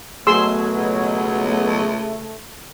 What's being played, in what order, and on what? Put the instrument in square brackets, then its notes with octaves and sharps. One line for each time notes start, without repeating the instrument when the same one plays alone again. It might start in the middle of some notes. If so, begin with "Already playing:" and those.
[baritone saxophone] F#2 [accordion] B2 F#3 [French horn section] A3 [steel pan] G#4 C6 E6
[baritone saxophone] C#2
[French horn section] A3